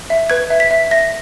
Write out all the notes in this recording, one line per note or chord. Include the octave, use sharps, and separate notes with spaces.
E5
B4 G#6
E5
B6
E5
E5 A#6